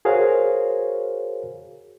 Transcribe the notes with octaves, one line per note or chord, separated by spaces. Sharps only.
F#4 G#4 A#4 C5 C#5 F5